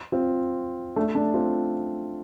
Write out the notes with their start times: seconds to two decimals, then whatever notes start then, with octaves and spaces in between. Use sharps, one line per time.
0.12 C4 F4
0.96 A3 D4
1.15 A3 D4
1.34 C4 F4